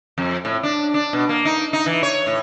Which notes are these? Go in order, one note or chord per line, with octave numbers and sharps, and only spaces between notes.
F2
A2
D4
D4
B2
A#3
D#4
D#4
E3
C#5
A2